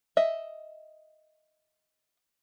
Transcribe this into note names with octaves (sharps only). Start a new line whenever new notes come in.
D#5 E5